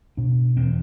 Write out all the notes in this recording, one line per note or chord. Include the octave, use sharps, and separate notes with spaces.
B2 D4
E2 C4